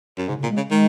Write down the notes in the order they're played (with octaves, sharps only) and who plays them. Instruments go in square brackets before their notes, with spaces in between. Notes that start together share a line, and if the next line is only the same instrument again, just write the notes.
[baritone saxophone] F#2
[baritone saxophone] G#2 [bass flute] C#3
[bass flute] C#3
[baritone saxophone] A#2
[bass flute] G#3
[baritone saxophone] C#3
[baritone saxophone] D#3 [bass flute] G#3